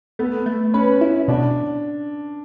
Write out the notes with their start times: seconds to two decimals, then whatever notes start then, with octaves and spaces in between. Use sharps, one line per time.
0.19 A3 B3
0.46 A3
0.74 C#4 B4
1.01 E4
1.28 B2 D4